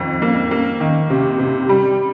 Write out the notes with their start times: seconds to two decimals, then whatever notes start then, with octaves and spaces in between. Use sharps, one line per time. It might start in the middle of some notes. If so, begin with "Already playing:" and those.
Already playing: F2 D#3
0.22 A#3
0.51 A#3
0.80 D#3
1.10 C3
1.39 C3
1.69 G3